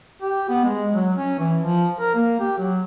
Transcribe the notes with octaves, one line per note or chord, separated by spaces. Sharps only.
G4
B3
G#3
F#3
C#4
E3
F3
A#4
A#3
G4
F#3